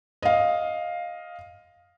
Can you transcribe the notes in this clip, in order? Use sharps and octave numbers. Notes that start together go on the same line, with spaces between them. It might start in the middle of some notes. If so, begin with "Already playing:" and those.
D#5 F5